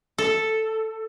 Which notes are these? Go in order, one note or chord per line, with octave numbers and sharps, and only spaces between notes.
A4